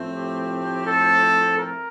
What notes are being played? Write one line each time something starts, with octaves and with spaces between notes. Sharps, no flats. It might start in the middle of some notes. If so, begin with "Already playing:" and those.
Already playing: A2 F3 A3 C4
G4
A4
A#4